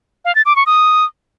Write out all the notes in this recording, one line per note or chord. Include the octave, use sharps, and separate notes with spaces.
F5
A6
D6
C#6
D#6